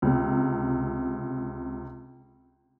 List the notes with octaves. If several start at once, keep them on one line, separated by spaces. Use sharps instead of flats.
C#2 C3